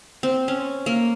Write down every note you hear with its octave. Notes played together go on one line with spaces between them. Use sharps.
C4
C#4
A#3